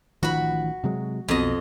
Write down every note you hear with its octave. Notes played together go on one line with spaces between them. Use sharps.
A1 D#3 F3 F#4 B5
C3 F#3 G#3
B1 F2 B2 D#5